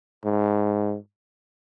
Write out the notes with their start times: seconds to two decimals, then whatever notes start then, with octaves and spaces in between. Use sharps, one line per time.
0.25 G#2